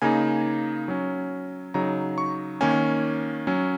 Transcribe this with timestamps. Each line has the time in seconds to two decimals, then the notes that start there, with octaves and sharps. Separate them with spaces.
0.02 C#3 A#3 D#4 G#5
0.88 F#3 C#4
1.74 C#3 F#3 D#4 A#5
2.18 C#6
2.61 D#3 A#3 C#4 G#5
3.47 F#3 C#4